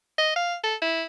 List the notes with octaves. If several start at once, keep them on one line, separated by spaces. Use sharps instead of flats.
D#5
F5
A4
E4